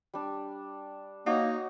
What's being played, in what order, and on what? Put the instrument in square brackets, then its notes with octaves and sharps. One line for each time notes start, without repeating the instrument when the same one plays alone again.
[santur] G3 D4
[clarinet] A#3 [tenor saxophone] D#4 [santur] F#4 C#5